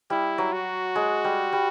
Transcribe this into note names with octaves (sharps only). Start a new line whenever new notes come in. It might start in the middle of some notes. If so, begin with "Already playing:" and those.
G3 E4
F#3
F#4
G#3
G3
G3